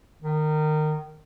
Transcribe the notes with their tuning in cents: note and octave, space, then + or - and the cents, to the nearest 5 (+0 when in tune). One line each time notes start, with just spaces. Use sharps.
D#3 -20